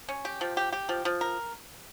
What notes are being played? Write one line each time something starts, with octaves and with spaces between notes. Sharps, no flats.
C#4
G4
F3
G4
G4
F3
F3
A#4